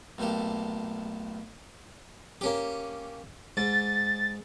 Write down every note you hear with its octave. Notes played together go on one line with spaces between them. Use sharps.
B1 A2 A#3 G4 A4
A#3 C#4 G4
G#2 A6